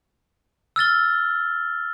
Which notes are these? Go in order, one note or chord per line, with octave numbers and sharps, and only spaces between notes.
E6 F6 A6 G7